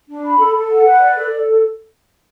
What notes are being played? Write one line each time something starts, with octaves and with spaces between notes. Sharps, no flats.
D4
B5
A4
A4
F#5
B4
D5
A4
A4